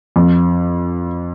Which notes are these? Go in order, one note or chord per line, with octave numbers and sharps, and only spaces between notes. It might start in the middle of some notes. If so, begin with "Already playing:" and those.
F2